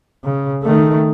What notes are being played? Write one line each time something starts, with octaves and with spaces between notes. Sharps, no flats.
C#3
D#3 A3